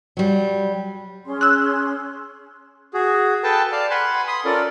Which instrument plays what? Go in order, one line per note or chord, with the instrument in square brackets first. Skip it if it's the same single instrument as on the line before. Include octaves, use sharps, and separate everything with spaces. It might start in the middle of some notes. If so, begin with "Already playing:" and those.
[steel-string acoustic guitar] F#3 G3
[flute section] C#4 G#4 C6
[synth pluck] E6 F#6
[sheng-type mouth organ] F#4 G#4
A4 B4 G5 A5
D5 F5 A5
B4 F#5 G#5 B5 C6
B5 C6 D#6
C#4 F4 A4 A#4 D5